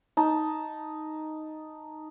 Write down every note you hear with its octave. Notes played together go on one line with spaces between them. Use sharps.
D#4 A5